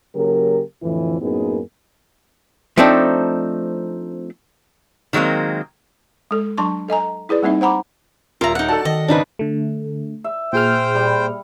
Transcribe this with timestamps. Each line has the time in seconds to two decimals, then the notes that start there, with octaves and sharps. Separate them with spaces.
0.14 C#3 F#3 A#3 G4 A#4
0.83 F2 A2 D3 E3
1.22 F#2 A2 A#3 B3 D#4 G#4
2.77 F3 A3 C4 D4 D#4
5.13 D#3 F#3 G#3 A#3 C4
6.31 G#3 A4
6.58 F#3 D4 A5 C6 C#6
6.88 A4 D#5 G#5 A#5
7.29 E4 G#4 B4 D5
7.43 G3 A#3 C4 D#4 E5
7.61 C5 F#5 A#5 B5 D6
8.41 D#1 F4 A#4 E5 A#5 F7
8.55 D#4 F#5
8.68 F#4 A4 D5 A5
8.85 D#3 D#5
9.08 G#2 C#3 C4 D4 D#4 B4
9.39 D3 A3
10.24 E5
10.53 A#2 G#4 C5 G5 F6
10.95 G3